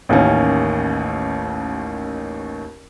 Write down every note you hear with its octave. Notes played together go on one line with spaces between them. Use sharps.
A1 D#2 D#3 C#4